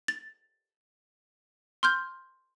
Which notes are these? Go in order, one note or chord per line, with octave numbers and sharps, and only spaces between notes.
A6
C6 F6 G6